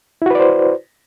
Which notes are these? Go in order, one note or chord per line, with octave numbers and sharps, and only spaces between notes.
E4 F#4 B4 C5 D5